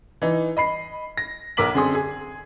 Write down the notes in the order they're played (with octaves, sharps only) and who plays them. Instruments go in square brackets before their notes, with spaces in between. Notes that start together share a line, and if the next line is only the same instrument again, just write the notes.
[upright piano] E3 D#4
D#5 B5 C7
A#6
B1 A#4 D6 B6 F#7
F#2 D3 C4 G#4 C6 D#6
G#4